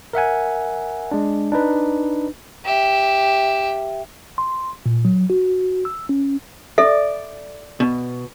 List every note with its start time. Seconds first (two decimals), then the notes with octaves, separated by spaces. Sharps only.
0.13 A#4 E5 F#5 G#5
1.11 G#3 D4
1.52 D4 D#4 B4
2.65 G4 E5
4.38 C6
4.86 A#2
5.05 F#3
5.30 F#4
5.85 E6
6.09 C#4
6.78 A4 D5 E5
7.80 B2